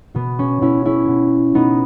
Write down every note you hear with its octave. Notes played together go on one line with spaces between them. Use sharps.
B2 B3
C#4
B2 C#4 E4
C#4 E4
B2
B2 B3 D#4